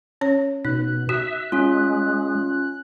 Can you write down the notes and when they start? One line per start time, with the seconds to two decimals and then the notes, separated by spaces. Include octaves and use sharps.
0.21 C#4 C#5
0.65 B2 D#4 F#6
1.09 F#4 E5
1.52 G#3 C#4 F4